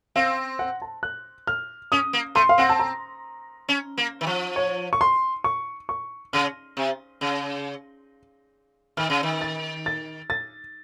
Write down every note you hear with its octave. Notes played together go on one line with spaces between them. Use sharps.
C4 F5
F#5
A5
F#6
F6
C#4 D#6
A#3
A3 C6
F5
C4 F#5
A5
A#5
C#4
A#3
D#3
F3
C#5
C#6
C6
C#6
C#6
C#3 F6
C3
C#3
D#3 F6
C#3
D#3
A6
A6
A6